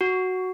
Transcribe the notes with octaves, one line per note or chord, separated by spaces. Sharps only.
F#4